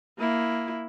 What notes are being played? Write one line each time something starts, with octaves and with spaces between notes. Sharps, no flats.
A#3 E4